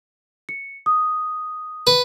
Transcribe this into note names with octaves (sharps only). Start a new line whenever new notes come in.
C#7
D#6
B4